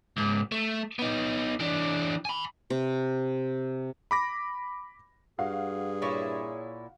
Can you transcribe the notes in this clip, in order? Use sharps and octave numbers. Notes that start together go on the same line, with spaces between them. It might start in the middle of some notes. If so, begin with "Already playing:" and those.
C#2 G#2
A3
B3 D#4
E3 D4
G#5 B5
C3
B5 D6 A#6
G2 F#4 G#4 F5
A#2 E4 C#5